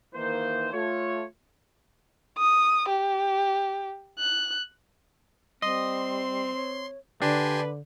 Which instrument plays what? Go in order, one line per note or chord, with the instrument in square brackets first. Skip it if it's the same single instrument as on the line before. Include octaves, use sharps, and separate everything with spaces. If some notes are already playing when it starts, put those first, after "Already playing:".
[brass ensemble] D#3 E3 A#3 C5
A3 F4 C#5
[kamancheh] D#6
G4
F#6
[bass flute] G3 [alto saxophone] C4 [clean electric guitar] D#5 [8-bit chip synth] C6
[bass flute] C#5
[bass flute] D3 [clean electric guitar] D4 [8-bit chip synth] G4 G#5 C6 [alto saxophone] B4